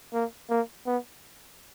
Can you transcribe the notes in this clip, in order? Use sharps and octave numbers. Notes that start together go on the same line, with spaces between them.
A#3
A#3
B3